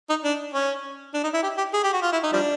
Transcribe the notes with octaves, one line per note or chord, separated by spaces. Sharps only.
D#4
D4
C#4
D4
D#4
E4
G4
G4
G#4
G4
F#4
F4
E4
D#4
F3 G3 D4